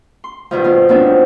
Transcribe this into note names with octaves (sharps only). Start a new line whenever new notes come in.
C6
G2 B2 D#3 F3
B2 F4
F3 F#3 B3 C4 D4 D#4